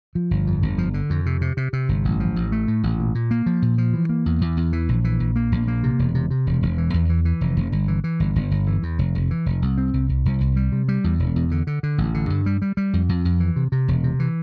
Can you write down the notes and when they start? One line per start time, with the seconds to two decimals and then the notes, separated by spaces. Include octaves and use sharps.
0.15 F3
0.31 G1
0.47 F2
0.62 G1
0.78 F3
0.94 D3
1.10 F2
1.26 C3
1.41 C3
1.57 C3
1.73 C3
1.89 G1
2.05 A1
2.20 F3
2.36 A1
2.52 A3
2.68 A2
2.83 A1
2.99 A#2
3.15 A#2
3.31 A#3
3.46 F3
3.62 A#2
3.78 F3
3.94 E3
4.09 A#3
4.26 E2
4.41 E2
4.57 E2
4.73 E3
4.89 A#1
5.04 E3
5.20 A#1
5.36 A#3
5.52 A#1
5.68 A#3
5.83 C3
5.99 E1
6.15 C3
6.30 C3
6.47 E1
6.62 E1
6.78 E3
6.94 E2
7.09 E3
7.25 E3
7.41 F1
7.56 F1
7.72 G1
7.88 E3
8.04 E3
8.20 G1
8.36 G1
8.51 G1
8.67 E3
8.83 E2
8.99 F1
9.15 F1
9.31 E3
9.46 F1
9.62 C2
9.78 C4
9.93 C2
10.09 C2
10.25 C2
10.41 C2
10.56 G3
10.72 C3
10.88 G3
11.04 E2
11.19 E1
11.36 E2
11.51 D3
11.67 D3
11.83 D3
11.98 A1
12.14 D3
12.30 G2
12.46 G3
12.62 G3
12.77 G3
12.93 F2
13.09 F2
13.25 F2
13.40 E3
13.56 C3
13.72 C3
13.88 E1
14.04 C3
14.19 E3